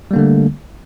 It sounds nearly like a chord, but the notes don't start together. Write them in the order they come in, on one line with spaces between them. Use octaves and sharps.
G3 A#3 D3 A3